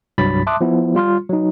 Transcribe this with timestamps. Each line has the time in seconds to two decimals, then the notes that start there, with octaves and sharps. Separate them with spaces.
0.18 C2 G2 F#3 B5 A6 B6
0.47 E5 A5 C6 D6 D#6 F#6
0.61 F3 B3 E4
0.95 G3 F4 C6 F6
1.29 F#3 D#4